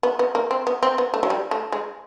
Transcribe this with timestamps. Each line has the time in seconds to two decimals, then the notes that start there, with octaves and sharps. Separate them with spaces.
0.03 B3
0.19 B3
0.35 A#3
0.51 C4
0.67 B3
0.83 C4
0.98 B3
1.14 A3
1.23 F#3
1.30 G3
1.51 A3
1.72 G#3